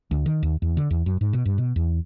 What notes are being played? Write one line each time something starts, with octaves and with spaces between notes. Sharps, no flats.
D2
D#3
D#2
E2
D3
E2
F#2
G#2
B2
G2
B2
E2